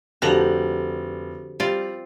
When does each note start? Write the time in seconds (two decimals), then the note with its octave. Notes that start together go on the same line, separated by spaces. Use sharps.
0.22 F1 D3 F3 F#4 G4 C5 A#5 F#7
1.60 G3 C4 F4 D5